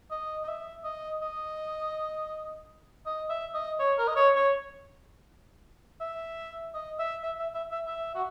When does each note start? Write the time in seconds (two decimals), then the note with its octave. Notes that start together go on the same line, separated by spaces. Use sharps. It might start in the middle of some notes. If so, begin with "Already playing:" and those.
0.11 D#5
0.44 D#5
0.48 E5
0.84 D#5
1.22 D#5
3.06 D#5
3.30 E5
3.54 D#5
3.79 C#5
3.98 A#4
4.08 D#5
4.16 C#5
4.35 C#5
6.01 E5
6.74 D#5
6.99 E5
7.23 E5
7.39 E5
7.54 E5
7.71 E5
7.87 E5
8.15 F#4